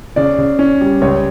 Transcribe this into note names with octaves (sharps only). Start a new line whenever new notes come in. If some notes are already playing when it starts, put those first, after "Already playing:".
C#3 D5
C#3
C#4
G3
C#2 C#5